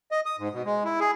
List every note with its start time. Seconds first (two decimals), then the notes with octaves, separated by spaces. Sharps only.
0.11 D#5
0.26 D#6
0.39 G#2
0.53 B2
0.65 G#3
0.85 E4
1.00 G#4